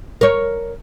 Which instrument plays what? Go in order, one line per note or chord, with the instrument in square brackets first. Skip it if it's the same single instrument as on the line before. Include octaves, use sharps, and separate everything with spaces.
[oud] A#4 C#5